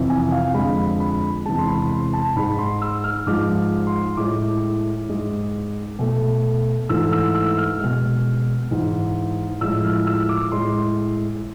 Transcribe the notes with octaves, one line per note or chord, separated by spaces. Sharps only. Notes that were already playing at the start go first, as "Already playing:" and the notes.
Already playing: F2 C3 E3
G#5
F5
F2 D3 G#3 B5
B5
E2 C3 G#3 A5
C6
B5
C6
A5
G#2 G#3 B5
C6
E6
F6
G#2 F3 G#3 D6
C6
A2 G#3 D6
G#2 G#3
B2 A3
G#2 E3 A3 E6
E6
E6
F6
B2 G#3
G#2 E3 G#3
A2 F3 G#3 E6
F6
E6
D6
A2 G#3 C6